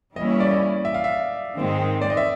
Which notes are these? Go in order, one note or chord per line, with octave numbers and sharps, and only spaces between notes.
E3 G3 A#3 C#4 E4 D#5
D5
D#5
E5
F5
E5
G#2 D#3 G#3 C4
D5
D#5
E5